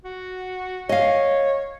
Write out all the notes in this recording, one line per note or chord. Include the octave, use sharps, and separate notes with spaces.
F#4
C#5 D#5 F5